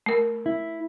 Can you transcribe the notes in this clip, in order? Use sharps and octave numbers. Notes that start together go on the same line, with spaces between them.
A3 A#4
E4